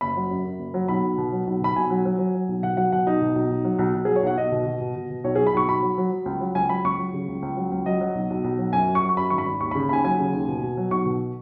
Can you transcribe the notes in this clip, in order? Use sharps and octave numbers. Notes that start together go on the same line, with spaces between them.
F#1 B5
F#3
F#2
F#2
F#1
F#3
B1 B5
B1
B2
F#3
B1
B2 B5
B1 G#5
F#3
F#3
F#3
F#3
B1
B2 F#5
F#3 F#5
B2 F#5
B1 D#4
B2
B1
B1
F#3
B1
B1
F#3 G#4
C#5
B1 F#5
B1 D#5
B2
B2
B2
B2
B2
B1 C#5
F#3 G#4
B5
B1 C#6
B1 B5
F#3
F#3
F#3
C#2
F#3
C#2 G#5
F#3 B5
C#2 C#6
F#3
C#3
C#2
C#2
F#3
C#2
F#3 D#5
F#3
B1
B1
B1
F#3
F#2 G#5
F#3
C#6
F#3
C#6
F#2 B5
G#1 C#6
B5
G#1
D#2 C#6
C#3 B5
D#2 G#5 B5
F#3 G#5
C#3
D#2
B2
B2
F#3
B1 C#6
B2